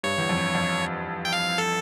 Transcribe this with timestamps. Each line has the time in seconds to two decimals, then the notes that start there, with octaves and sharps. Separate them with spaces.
0.03 G2 C#5
0.18 E2
0.29 F2
0.55 F2
1.25 G5
1.33 F5
1.58 A4